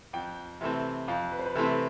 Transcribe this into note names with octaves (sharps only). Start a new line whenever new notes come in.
F2 G5
C3 E3 A3 C4
F2 F5
B4
C5
B4
C3 E3 A3 C4 A4